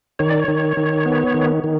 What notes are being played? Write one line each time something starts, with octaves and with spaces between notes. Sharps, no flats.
D#3 C#5
D5
C#5
D#3
D#3
B3
D#3
D#3